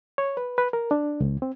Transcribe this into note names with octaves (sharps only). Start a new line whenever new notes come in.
C#5
B4
B4
A#4
D4
C#2
C4